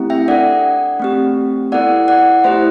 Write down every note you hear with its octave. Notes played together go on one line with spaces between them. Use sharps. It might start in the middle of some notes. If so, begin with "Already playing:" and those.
Already playing: A3 C4 E4 G4
E5 G5
D4 A4 D5 F#5
A3 C4 G4
B3 E4 A4 D5 F#5
D5 F#5
A3 E4 G4 C5 E5